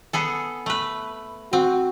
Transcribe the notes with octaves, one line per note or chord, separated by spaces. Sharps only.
B3 G#4 A4
A3 B4
C4 F#4